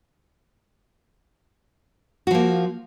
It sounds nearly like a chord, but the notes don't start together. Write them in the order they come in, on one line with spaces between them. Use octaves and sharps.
F#4 F3 A#3